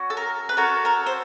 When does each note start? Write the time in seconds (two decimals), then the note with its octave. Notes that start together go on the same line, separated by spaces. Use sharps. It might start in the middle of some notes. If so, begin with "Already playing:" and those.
Already playing: C#4 F#4
0.10 A4
0.17 A#4
0.49 B4
0.57 C#4 F#4 A4 A#4
0.85 A#4
1.06 C5